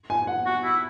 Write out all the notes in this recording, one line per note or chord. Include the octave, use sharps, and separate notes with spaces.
G#5
F#5
F#4
E4